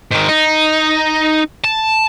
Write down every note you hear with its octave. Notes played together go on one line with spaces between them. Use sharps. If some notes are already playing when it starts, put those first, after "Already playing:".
G#2 D#3
D#4
A5